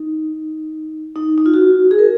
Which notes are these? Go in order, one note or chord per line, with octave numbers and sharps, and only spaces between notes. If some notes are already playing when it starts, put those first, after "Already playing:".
Already playing: D#4
D#4
D#4
F4
F#4
G#4
A#4